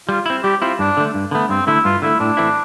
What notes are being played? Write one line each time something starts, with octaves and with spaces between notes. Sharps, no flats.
G3 F4
C4 E4
G3 G4
C4 E4 F4
G2 D4
D3 A3
G2
D3 A3 B3
G2 C4
D3 A3 E4
G2 F4
D3 A3 E4
A2 D4
E3 A3 C4 E4